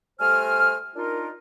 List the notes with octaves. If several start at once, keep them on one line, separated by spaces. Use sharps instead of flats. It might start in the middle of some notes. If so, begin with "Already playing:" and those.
G3 A3 C5 G#5 F6
D4 D#4 F4 A#4